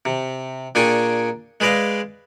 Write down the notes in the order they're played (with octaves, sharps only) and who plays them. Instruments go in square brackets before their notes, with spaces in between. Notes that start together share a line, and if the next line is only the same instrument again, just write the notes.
[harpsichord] C3
A#2 D4 G#4 G5 G#5 C#6
G#3 G#4 B4 D5 D#5 F5